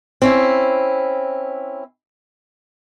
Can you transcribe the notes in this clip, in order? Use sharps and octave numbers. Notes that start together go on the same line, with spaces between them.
C4 C#4 E4